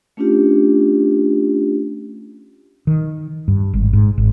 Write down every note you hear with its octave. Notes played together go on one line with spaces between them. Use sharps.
A3 C#4 D4 F4 G4
D#3
G2
G#1
G#2
G#1